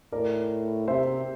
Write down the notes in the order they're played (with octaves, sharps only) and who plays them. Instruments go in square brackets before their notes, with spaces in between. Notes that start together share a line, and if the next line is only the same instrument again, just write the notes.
[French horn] A2 [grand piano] A#4 D5
[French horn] C3 [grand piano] C5 E5